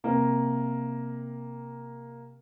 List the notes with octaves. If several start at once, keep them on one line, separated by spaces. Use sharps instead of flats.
C3 A#3 A#4